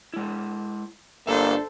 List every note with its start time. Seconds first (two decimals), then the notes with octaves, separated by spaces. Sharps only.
0.14 G#3 E4
1.27 G1 A#3 D4 A4 C5 E5